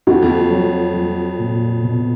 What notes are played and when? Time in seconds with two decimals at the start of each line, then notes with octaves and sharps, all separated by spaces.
0.07 F2 F#4
0.22 F2
0.50 F#3
0.94 F#3
1.39 A#2
1.83 B2